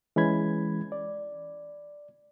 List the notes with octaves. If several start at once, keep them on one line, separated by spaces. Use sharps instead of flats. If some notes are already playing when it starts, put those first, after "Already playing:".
E3 G#3 C#4 B5 G#6
D5